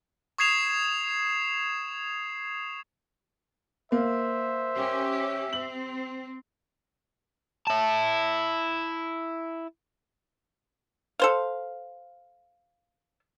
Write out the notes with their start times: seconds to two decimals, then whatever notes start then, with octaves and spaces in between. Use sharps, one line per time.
0.38 C#6 D#6 G#6 C7 E7 F7
3.92 A#3 C5 E5
4.75 C#4 G4
5.53 C4 F#7
7.67 E4 A5
11.20 A4 C5 F5